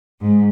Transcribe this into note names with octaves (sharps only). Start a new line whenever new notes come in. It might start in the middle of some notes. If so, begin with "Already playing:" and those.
G#2